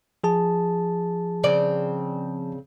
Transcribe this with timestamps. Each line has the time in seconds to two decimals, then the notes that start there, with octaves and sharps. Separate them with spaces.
0.24 F3 G#4 A5
1.44 C#3 C4 D5